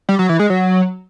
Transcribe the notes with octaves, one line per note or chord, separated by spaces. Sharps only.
G3
F#3
E3
G#3
F#3